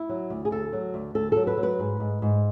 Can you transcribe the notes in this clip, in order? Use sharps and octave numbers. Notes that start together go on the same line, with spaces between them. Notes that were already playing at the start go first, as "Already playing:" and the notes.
Already playing: E4
F#3
D2
G#4
D2 A4
F#3
D2
D2 A4
F#3 A4
B4
F#3
B4
G#2
G#2
G#2